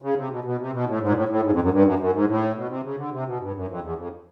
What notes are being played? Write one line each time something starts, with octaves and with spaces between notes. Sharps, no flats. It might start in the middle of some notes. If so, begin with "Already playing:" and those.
C#3
C3
B2
B2
C3
B2
A2
G#2
A#2
A2
A2
G#2
F2
F#2
G2
F#2
F#2
G#2
A2
B2
C3
C#3
D3
C3
B2
G2
F#2
F2
E2
F2